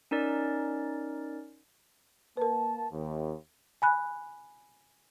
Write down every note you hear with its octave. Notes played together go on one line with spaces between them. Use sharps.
C#4 D#4 A#4 D5
A#3 A#4 B4 A5
D#2
G#5 B5 F#6